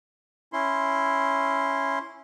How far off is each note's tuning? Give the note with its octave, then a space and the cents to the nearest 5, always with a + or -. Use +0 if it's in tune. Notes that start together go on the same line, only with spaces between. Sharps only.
C#4 +0 E4 +0 C6 +0